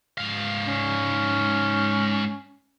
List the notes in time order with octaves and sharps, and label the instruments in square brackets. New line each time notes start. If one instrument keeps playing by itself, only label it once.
[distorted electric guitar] G#2 F5
[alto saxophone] C#4